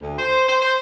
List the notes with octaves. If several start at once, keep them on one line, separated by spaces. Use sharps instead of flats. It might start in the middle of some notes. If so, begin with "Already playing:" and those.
D2
C5
C5
C5